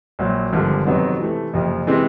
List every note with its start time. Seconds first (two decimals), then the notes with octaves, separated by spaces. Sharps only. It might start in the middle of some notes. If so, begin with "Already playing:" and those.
0.19 A#1 A#2 F#3
0.53 G#1 G2 D3 F3
0.86 F2 C3 D#3 F#3 B3
1.20 C3 E3 A3
1.53 F#1 F2 C3 F3
1.87 C3 E3 G#3 C4